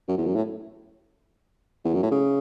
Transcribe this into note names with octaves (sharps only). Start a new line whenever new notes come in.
F#2
E2
F#2
A2
E2
F#2
A2
C#3